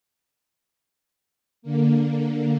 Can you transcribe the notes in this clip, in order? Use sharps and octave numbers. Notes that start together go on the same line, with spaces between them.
D3 A#3